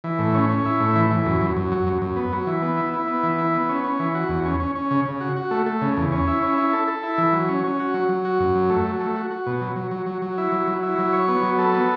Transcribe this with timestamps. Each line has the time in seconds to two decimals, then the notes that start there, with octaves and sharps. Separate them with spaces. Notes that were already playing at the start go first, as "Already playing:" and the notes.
0.04 E3
0.19 A2
0.35 C#4
0.49 C#4
0.65 E4
0.80 A2
0.96 E3
1.10 E3
1.26 F#2
1.41 F#2
1.56 F#2
1.72 F#3
1.87 F#2
2.02 F#2
2.16 B3
2.33 F#3
2.47 E3
2.62 B3
2.77 E4
2.93 E4
3.07 B3
3.23 E3
3.38 E4
3.54 B3
3.69 C#4
3.84 C#4
3.99 E3
4.15 F#4
4.29 E2
4.45 C#4
4.60 C#4
4.75 C#4
4.91 C#3
5.05 C#3
5.21 F#4
5.37 F#4
5.51 A3
5.66 A3
5.82 C#3
5.97 E2
6.12 C#4
6.27 E4
6.43 C#4
6.58 E4
6.73 A4
6.88 A4
7.03 E4
7.18 E3
7.33 F#3
7.48 C#4
7.64 C#4
7.80 F#4
7.94 F#3
8.09 F#3
8.25 F#4
8.40 F#2
8.55 F#3
8.70 A3
8.85 F#3
9.00 A3
9.16 F#4
9.31 F#4
9.47 B2
9.61 F#3
9.76 F#3
9.91 F#3
10.06 F#3
10.22 F#3
10.38 E4
10.52 F#3
10.67 F#3
10.83 E4
10.99 F#3
11.13 C#5
11.28 B3
11.43 F#3
11.59 A4
11.74 B3